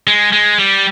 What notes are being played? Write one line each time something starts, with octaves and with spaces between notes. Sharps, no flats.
G#3
G#3
G3